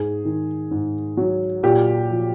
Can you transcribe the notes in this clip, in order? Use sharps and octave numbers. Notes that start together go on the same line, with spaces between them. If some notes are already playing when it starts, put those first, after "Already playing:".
Already playing: G#2 G#4
D#3
G#2
F#3
A#2 G4
F3